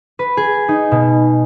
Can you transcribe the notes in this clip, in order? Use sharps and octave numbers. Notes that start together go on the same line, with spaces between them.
B4
G#4
D#4
B2